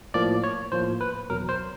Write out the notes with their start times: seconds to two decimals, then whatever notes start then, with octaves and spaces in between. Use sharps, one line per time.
0.14 A2 F3 A#3 D5
0.44 C#5
0.72 A2 F3 A#3 C5
1.01 B4
1.30 E2 B2 F#3 A#4
1.49 C5